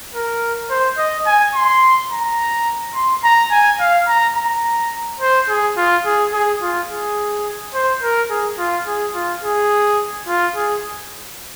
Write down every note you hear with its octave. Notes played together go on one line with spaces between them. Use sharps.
A#4
C5
D#5
G#5
C6
A#5
C6
A#5
G#5
F5
A#5
A#5
C5
G#4
F4
G#4
G#4
F4
G#4
C5
A#4
G#4
F4
G#4
F4
G#4
F4
G#4